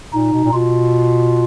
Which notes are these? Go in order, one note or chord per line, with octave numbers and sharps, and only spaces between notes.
A#2 D#4
B2
A#2
B2 F4